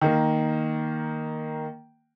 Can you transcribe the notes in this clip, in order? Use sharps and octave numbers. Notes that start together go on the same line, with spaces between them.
D#3 A#3